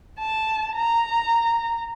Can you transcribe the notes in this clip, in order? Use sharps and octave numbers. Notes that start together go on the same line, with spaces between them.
A5
A#5